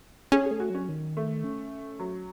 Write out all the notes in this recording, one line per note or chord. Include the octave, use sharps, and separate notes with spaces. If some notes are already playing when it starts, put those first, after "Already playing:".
C#4 G#4
G#4
A3
F#4
F#3 C#4
D#3
A3
C#4
F#3